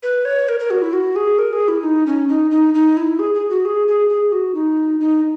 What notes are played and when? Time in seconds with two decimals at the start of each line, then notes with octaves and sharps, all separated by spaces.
0.03 B4
0.25 C#5
0.49 A#4
0.60 A#4
0.70 F#4
0.82 E4
0.93 F#4
1.16 G#4
1.38 A#4
1.53 G#4
1.68 E4
1.83 D#4
2.07 C#4
2.29 D#4
2.51 D#4
2.74 D#4
2.97 E4
3.19 G#4
3.35 G#4
3.50 F#4
3.65 G#4
3.88 G#4
4.09 G#4
4.32 F#4
4.55 D#4
5.00 D#4